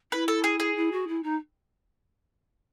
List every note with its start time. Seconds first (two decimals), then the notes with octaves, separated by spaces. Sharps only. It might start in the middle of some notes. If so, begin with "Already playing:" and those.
0.12 E4 B4
0.28 A4
0.44 G#4
0.60 G#4
0.75 E4
0.91 F#4
1.07 E4
1.23 D#4